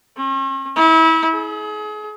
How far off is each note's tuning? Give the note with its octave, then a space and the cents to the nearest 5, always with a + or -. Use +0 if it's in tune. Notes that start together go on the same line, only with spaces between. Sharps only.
C#4 -45
E4 -30
G#4 +35